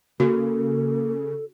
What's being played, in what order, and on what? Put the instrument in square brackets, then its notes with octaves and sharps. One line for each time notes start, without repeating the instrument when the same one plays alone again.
[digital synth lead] C#3 [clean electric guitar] A#3 [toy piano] F#4 [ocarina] A4